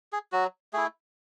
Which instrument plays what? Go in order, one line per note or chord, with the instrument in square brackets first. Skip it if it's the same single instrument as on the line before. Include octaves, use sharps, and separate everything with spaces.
[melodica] G#4
F#3 F#4
A3 E4 G#4